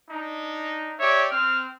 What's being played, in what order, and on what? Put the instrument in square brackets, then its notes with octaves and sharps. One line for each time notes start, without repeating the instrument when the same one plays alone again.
[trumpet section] D4 D#4
[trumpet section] G4 D5 E5 [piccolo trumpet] C#5
[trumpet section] C4 [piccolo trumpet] F6